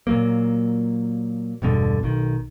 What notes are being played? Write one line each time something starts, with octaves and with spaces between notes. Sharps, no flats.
A#2 F#3 A#3
E1 G2 B2 D3
B1 D#3